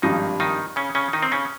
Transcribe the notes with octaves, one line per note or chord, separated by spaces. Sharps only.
G#1 G2 D#3 F3 D#4
D#3 D#4
C#3 C#4
C#3 C#4
D#3 D#4
C4
C#3 C#4